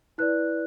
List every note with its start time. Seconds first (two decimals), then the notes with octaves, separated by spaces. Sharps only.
0.18 E4 B4 D5 F#6